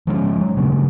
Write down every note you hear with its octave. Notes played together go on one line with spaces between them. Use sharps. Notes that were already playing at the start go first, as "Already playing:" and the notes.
F3 G#3 A#3 C#4
F#3
A#2 C#3 A3